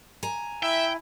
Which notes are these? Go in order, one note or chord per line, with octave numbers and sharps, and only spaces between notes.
G#5 A#5
E4 E5 G5